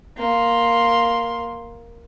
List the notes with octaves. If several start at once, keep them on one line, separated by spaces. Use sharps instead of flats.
A#3 C6